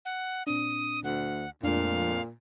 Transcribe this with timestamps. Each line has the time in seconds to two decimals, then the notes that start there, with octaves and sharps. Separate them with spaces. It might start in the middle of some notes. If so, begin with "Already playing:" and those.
0.05 F#5
0.47 A#2 C4 D4 D#6
1.04 D2 F#5
1.63 F2 A#2 G#3 A3 D4 F5